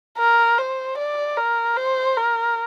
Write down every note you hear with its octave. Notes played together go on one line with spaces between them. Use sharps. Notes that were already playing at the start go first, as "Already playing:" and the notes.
A#4
C5
D5
A#4
C5
A#4